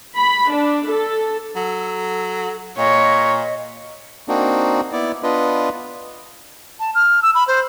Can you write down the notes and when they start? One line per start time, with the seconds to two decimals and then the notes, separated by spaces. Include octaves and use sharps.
0.16 B5
0.51 D4
0.89 A4
1.56 F#3 A4
2.78 A#2 C#5 D#5
4.28 A#3 C4 D4 D#4 F#4
4.92 B3 E4 D5
5.23 B3 D4 F4 B4 D#5
6.80 A5
6.95 F6
7.22 E6
7.35 B5
7.47 C5